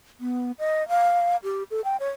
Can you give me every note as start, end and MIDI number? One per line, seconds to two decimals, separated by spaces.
0.20 0.52 59
0.59 0.87 75
0.89 1.36 77
1.43 1.63 67
1.71 1.81 69
1.84 1.96 79
2.00 2.09 73